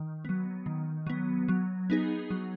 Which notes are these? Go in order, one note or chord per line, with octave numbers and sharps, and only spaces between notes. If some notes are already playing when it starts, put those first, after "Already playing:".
Already playing: D#3
F#3 B3
D#3
F#3 B3
F#3
B3 D#4 G#4
F#3